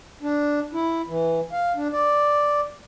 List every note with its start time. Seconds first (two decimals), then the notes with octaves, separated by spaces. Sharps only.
0.22 D4
0.73 E4
1.08 E3
1.52 F5
1.75 D4
1.92 D5